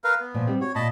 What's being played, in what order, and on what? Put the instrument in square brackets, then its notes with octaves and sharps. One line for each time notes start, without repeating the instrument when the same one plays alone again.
[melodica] A#4 B4 F5
B3
[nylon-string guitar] A#2 F3
G3 C4
[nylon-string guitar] F#4 [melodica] C#5
[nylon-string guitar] A#2 [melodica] D#5 A5 B5